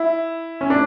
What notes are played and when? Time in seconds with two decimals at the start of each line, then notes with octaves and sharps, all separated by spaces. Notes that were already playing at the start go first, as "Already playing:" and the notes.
Already playing: E4
0.61 C#4
0.70 D4